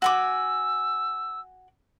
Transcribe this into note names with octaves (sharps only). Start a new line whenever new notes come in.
F#4 G#5 D6 E6